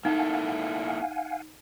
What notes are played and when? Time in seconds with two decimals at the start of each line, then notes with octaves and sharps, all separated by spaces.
0.05 A#3 D#4 E4 A4 F5 F#5 G#5